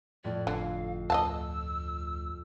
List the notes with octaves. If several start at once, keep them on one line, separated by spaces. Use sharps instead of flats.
F2 A2 D5 G#6
G1 D3 F5
D2 D#5 F5 A5 E6